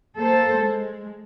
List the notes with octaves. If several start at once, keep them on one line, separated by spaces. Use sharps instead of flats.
A#3 A4 C5
G#3